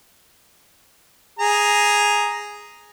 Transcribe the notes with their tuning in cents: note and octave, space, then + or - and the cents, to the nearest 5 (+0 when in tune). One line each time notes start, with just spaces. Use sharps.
G#4 +0 A#5 +0